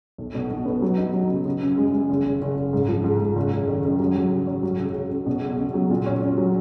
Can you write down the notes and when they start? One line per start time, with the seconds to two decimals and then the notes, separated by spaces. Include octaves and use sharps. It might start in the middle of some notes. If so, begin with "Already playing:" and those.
0.18 B1
0.35 B2
0.51 B1
0.66 B3
0.82 F#3
0.98 D#4
1.14 F#3
1.30 C#3
1.45 C#3
1.62 F#2
1.77 G#3
1.93 G#3
2.09 F#1
2.25 F#1
2.41 F#1
2.57 F#1
2.73 G#2
2.89 F3
3.04 G#2
3.20 G#2
3.36 F#1
3.52 F#1
3.68 D#3
3.84 F#2
4.00 F#3
4.15 F#3
4.31 C#3
4.47 C#4
4.63 F#3
4.79 C#2
4.95 C#2
5.10 C#2
5.26 B2
5.43 C#2
5.58 C#2
5.74 F#3
5.90 A#2
6.06 C#4
6.22 C#4
6.38 F#3